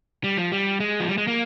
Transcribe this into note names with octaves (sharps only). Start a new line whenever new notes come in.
G3
F3
G3
G#3
F3
G3
G#3
A#3